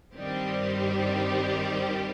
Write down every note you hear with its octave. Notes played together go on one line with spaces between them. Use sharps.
G2 D#3 G3 C4 G4